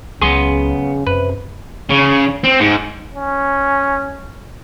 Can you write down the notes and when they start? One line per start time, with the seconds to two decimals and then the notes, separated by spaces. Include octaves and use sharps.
0.22 C#2 C#3 F#3 B3 G#4 C6
1.07 F#2 C3 B4
1.90 C#3
2.44 C4
2.60 G#2
3.15 C#4